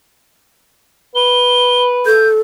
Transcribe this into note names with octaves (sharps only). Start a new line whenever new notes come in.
B4 G7
A4 G6